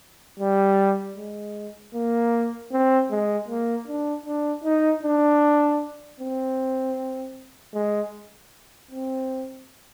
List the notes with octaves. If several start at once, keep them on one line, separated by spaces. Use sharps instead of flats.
G3
G#3
A#3
C4
G#3
A#3
D4
D4
D#4
D4
C4
G#3
C4